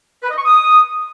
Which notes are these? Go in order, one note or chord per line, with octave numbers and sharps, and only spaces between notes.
B4
D#5
C#6
D#6